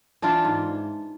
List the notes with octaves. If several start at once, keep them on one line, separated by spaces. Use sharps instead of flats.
E3 D4 F4
G#2